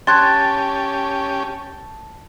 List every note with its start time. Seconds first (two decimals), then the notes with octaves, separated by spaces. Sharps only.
0.07 C#4 G4 A5 C6 F#6 G#6